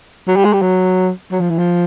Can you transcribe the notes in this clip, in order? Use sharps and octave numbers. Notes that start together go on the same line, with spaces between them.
F#3
G3
G#3
G3
F#3
F#3
F3
E3
F3